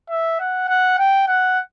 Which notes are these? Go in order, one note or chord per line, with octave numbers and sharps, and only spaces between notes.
E5
F#5
F#5
G5
F#5